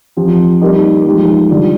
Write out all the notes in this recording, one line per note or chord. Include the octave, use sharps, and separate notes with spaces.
F3 C4 G4
G3 A#3 D#4 G4
F3 G#3 D#4 G4
D3 G3 D4 F4